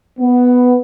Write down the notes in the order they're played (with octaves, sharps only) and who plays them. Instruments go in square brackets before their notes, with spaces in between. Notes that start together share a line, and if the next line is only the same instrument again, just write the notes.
[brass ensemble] B3